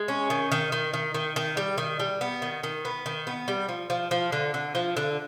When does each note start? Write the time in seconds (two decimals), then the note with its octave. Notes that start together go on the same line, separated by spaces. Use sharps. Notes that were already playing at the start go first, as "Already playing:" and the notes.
Already playing: G#3
0.08 C#4
0.30 D#3
0.52 D#3
0.72 D#3
0.94 D#3
1.14 D#3
1.36 D#3
1.57 G3
1.78 D#3
2.00 G3
2.21 B3
2.42 D#3
2.63 D#3
2.85 B3
3.06 D#3
3.27 B3
3.48 G3
3.69 F3
3.90 F3
4.11 F3
4.32 D3
4.54 D3
4.75 F3
4.97 D3